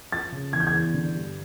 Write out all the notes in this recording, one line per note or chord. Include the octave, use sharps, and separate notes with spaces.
F3 A6
C#3
E2 G#6
G6
G#6
E2
D3
G2